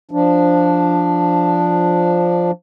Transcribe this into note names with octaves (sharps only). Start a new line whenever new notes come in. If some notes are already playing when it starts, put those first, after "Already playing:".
F3 D4